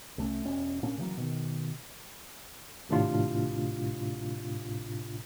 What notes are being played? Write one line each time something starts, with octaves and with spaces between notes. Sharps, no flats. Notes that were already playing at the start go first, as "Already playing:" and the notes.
C2 A3 C#4
E1 C#4
A#2 A#3 C#4 D4
C#3 E3 F#3 A#3
B2 D#3
G#1 A2 C3 D4 F4